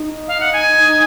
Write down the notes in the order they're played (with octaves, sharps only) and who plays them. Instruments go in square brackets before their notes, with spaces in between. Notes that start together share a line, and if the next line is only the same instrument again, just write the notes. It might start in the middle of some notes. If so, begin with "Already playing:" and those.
Already playing: [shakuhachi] D#4
[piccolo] F5
F#5
G#5